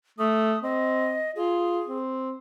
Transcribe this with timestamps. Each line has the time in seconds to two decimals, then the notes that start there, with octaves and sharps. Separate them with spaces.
0.19 A3 D#6
0.63 C4 D#5
1.36 F4 G#4
1.88 C4